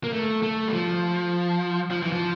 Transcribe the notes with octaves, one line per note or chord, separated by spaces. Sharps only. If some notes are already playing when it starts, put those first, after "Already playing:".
A#3
A3
A3
G3
F3
F3
E3
F3